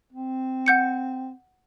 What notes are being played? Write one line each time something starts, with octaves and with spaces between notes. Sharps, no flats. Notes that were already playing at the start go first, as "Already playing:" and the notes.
C4
F#5 G6 C#7